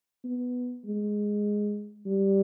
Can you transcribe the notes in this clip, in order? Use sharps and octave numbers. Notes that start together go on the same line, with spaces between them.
B3
G#3
G3